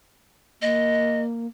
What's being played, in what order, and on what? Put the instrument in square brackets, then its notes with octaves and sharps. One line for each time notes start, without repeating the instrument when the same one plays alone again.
[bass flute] A#3 [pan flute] D#5